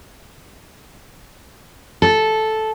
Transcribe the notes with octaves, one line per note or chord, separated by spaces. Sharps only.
A4